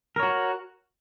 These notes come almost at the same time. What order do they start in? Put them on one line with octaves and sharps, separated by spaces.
A#4 C#5 F#4